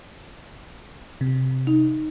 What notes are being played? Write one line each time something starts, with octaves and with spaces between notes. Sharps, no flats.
C3
D#4